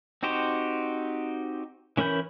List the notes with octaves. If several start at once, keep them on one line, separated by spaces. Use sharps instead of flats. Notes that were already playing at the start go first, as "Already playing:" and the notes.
C4 D#4 F#4 G4 C5
E3 C#4 A#4 B5 G6